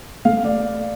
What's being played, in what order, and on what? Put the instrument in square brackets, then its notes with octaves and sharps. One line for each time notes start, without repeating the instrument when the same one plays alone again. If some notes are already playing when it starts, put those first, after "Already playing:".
[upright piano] A3 [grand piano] F5
[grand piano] D5